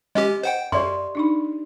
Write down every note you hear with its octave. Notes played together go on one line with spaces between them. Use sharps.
G#3 C#4 G4 D#5
C5 F#5 G5
F#2 G4 D5 E5 C6
D4 D#4 B5